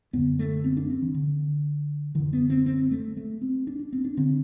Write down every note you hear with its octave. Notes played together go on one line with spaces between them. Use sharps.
F#2 D3 B3
A3
C4
D4
C4
E3
D3
F#2 D3 E3
B3
C4
C4
A3
A3
C4
D4
D4
C4
D4
D3 C4